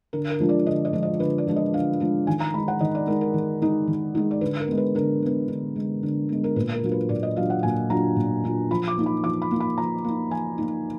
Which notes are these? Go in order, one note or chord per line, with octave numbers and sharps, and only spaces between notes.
D3 A#4
A#4
F3 G#3 D4 F4
D5
D3 D#5
D#5
F3 G#3 D4 F4
D#5
D3 B4
D5
F3 G#3 D4 F4
D#5
D3 F5
F3 G#3 D4 F4
D#3 G#5
A#5
G#3 D#4 B5
F#5
D#3 D#5
D5
G#3 D#4 A#4
A#4
D#3
G#3 D#4
D#3
G#3 D#4
D5
D3 B4
A#4
G#3 B3
B4
D3 A#4
G#3 B3
D3
G#3 B3
D3
G#3 B3
A#4
A#2 B4
A#4
F#3 D4 F4
B4
A#2 D5
D#5
F#3 D4 F4 F5
F#5
A#2 G#5
F#3 D4 F4 A#5
A#2
F#3 D4 F4
F3 B5
D6
A#3 D#4
B5
F3 D6
B5
A#3 D#4
B5
F3 A#5
A#3 D#4
F3 G#5
A#3 D#4